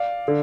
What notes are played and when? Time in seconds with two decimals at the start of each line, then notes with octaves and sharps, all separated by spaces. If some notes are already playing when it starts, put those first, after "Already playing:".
Already playing: D5 F5
0.28 D3